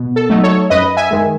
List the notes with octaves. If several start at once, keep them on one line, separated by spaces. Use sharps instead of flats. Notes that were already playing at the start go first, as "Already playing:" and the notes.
Already playing: B2
A4
F#3 A3 D#4
A4 C#5
F#2 B4 D#5
E5 G#5
D#3 G#3